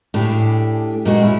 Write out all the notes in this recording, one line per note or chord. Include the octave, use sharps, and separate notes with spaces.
A2 D4 G4 G#4
A#2 G#3 F#4
C#4 E4